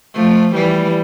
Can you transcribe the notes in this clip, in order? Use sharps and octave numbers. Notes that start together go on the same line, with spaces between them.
F3 A3
E3 G3